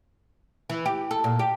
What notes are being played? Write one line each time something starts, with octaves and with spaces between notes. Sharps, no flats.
E3
G4
A4
A#2
G4